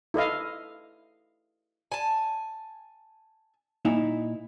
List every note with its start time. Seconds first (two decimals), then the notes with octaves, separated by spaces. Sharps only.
0.14 E4 A4 D#5 F5
1.92 G#5 A5
3.85 A#2 D#4 E4